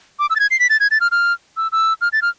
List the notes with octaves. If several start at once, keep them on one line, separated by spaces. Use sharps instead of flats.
D6
E6
A6
G#6
C7
B6
A6
G#6
A6
F6
F6
E6
E6
F6
A6
F6